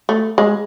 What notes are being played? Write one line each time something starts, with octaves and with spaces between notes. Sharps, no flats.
A3
G#3